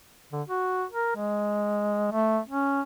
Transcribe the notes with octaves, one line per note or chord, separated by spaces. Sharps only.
D3
F#4
A#4
G#3
A3
C#4